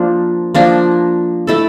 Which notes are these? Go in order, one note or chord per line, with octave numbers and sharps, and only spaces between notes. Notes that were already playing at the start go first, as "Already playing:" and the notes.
Already playing: F3 A#3 D4
F3 A#3 D4
A3 E4 A4